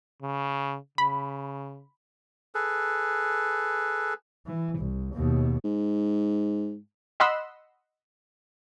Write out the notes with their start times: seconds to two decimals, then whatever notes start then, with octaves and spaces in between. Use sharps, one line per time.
0.23 C#3
0.98 C#3 B5
2.55 G#4 A4 B4
4.46 E3
4.78 C2
5.14 D#2 B2
5.64 G#2
7.20 D#5 F#5 B5 C6 E6